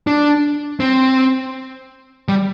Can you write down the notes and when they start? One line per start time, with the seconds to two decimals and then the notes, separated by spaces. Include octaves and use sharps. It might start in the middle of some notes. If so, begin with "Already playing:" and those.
0.07 D4
0.80 C4
2.28 G3